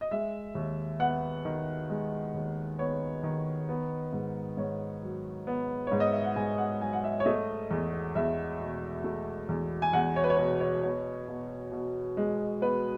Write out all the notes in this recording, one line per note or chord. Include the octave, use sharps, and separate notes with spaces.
D#5
G#3 E5
D#2
B3 F#5
D#3
G#3
D#2
B3 C#5
D#3
B3
G#2
G#2 C#5
F#3
B3
G#2 C#5
D#5
E5
F#5
G#2 G#5
F#5
F#3 G#5
F#5
E5
C#5
A3 D#5
E2
E2 E5
B2
A3
E2
G#5
E2 F#5
C#5
B4
C#5
B2 B4
C#5
B3 C#5
B2
B2
G#3
B3 B4